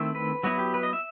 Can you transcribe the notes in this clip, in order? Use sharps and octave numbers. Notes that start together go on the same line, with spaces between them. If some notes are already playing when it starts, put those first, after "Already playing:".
Already playing: D#3 A3 C4 E4
B4
F#3 B3 E4 F#4
G4
B4
D#5
E5